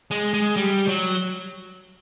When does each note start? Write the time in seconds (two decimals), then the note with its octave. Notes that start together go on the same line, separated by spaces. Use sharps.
0.11 G#3
0.34 G#3
0.57 G3
0.88 F#3